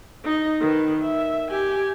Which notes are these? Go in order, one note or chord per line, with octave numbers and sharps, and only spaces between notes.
D#4 D#5
D#3 B4
E5
G4 G#5